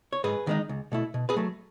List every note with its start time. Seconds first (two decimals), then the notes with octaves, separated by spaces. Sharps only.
0.13 C#5
0.24 G#2 G#4 B4
0.47 D#3 G#3 D#4
0.69 C#2
0.92 B2 A3 E4
1.14 B2
1.29 G#4 B4
1.36 F#3 A3